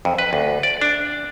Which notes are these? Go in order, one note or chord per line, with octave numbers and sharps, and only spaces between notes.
F2
B4
D2
D5
D4